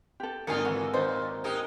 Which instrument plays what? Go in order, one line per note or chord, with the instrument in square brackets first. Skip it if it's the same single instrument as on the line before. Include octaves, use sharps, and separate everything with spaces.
[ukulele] G4 A4
[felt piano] G#1 G#5 C#7 [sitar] D3 D#4 F4 [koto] A#3 F5
[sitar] E3 [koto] F#4
[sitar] A#2 D#3 [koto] D#4 [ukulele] C5
[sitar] G#3 D#4 G4 [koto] A#4